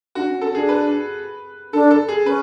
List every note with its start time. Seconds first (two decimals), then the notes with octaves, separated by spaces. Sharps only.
0.15 D4 F#4
0.29 C#4
0.41 C#4 A4
0.55 D4 G#4
0.69 B4
1.73 D4 A4
1.91 A4
2.08 G#4
2.25 C#4 B4